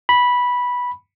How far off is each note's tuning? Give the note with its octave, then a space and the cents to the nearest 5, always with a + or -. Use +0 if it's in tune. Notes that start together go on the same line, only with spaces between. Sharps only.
B5 -10